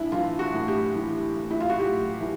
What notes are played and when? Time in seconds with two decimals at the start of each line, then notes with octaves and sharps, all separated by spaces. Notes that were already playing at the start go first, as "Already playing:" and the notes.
Already playing: A2 E3 D4 E4
0.12 E3 F4
0.39 F#4
0.54 A2
0.68 G4
0.95 E3
1.36 A2
1.51 E4
1.60 F4
1.70 F#4
1.79 A2 G4
2.20 E3